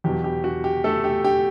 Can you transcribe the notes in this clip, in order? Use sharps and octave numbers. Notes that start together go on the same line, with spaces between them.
E2 B2 F#3 G4
G4
F#4
G4
A3 A4
G4
G4